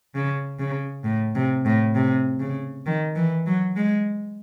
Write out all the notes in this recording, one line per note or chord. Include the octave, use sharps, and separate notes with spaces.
C#3
C#3
A2
C3
A2
C3
C#3
D#3
E3
F#3
G#3